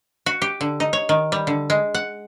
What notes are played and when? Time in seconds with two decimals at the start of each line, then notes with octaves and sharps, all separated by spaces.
0.26 F#4
0.42 G4
0.61 D3
0.80 D#4
0.93 C#5
1.09 D#3
1.32 G3
1.47 D3
1.70 G#3
1.95 F#5